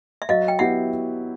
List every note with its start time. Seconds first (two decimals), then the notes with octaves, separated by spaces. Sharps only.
0.22 E5
0.29 F#3 D#5 F5
0.48 G5
0.59 B3 E4 G4 E5 F#5